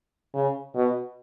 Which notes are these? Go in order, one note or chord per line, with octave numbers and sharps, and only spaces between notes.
C#3
B2